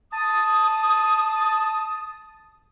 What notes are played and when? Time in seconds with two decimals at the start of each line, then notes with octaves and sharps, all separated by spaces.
0.12 A5 D#6